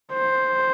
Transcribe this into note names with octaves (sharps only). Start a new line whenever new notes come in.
C5